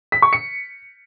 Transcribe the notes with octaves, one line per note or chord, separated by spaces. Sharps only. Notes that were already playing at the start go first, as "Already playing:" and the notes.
B6
C#6
C#7